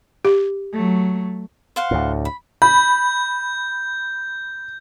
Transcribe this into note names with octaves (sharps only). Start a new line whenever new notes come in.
G4
F#3 A3
C5 F5 F#5
D2 A2
B5
B5 G6